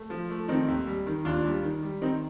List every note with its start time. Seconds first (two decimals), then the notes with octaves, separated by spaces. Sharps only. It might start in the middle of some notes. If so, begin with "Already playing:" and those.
Already playing: A3
0.10 F3
0.30 A3
0.48 D#3 C4 D#4
0.68 D#2
0.87 G3
1.07 D#3
1.25 D#2 D4 F4
1.44 G3
1.63 D#3
1.83 G3
2.02 D#3 C4 D#4